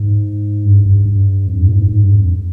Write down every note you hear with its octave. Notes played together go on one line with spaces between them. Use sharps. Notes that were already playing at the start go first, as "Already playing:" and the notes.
Already playing: G#2
G2
G2
G2
F2
G2
A#2
G#2
G#2
G2
F2